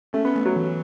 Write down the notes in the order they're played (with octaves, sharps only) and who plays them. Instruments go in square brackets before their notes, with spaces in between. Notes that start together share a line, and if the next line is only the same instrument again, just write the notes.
[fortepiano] A3 [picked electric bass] C#4
[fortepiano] B3
[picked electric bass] A3
[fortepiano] F#3
[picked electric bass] E3